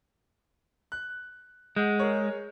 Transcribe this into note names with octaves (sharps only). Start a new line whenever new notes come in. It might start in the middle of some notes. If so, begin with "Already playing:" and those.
F#6
G#3 F#5 G6
G#4 A#4 C#5